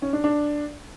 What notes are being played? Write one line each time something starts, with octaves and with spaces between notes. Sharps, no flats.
C#4
D4
D4